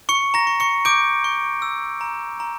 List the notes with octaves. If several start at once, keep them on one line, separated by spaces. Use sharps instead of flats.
C#6 C#7
A#5 A#6
C#6
C#6 C#7
D6 G6 D7
C#6
E6
A#5
A#5